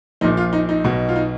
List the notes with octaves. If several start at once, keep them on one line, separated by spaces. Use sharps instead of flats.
A#1 A#2 F3 D#4
F4
D#4
D#4
B1 B2
F4
D#4